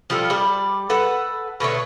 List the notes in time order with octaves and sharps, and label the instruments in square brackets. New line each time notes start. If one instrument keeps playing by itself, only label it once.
[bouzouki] F3 G3 F4 A4
G3 D5
A4 B4 F#5
B2 D3 A3 C#5